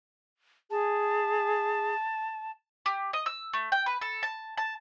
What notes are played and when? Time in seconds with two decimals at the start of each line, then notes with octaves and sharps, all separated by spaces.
0.71 G#4 A5
2.86 G4
3.13 D#5
3.26 E6
3.53 A3
3.72 G5
3.86 B4
4.01 A4
4.23 A5
4.58 A5